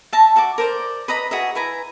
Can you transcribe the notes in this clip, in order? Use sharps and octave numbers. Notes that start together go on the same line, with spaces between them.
E5 A5 A#5
F#4 E5 A5 D6
A#4 C5 D5
B4 D#5 A#5 B5
F#4 G#4 D#5 E5
E4 B4 G#5 A#5